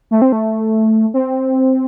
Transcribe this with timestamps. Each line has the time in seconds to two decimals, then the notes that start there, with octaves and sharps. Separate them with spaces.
0.11 A3
0.22 C4
0.32 A3
1.14 C4